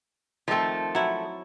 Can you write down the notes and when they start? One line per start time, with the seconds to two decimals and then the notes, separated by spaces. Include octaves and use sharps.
0.48 D#3 F3 A3 C4
0.95 F#3 E4